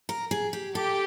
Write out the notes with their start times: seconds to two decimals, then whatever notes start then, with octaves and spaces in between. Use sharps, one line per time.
0.09 A#4
0.31 G#4
0.53 G4
0.75 G4 A4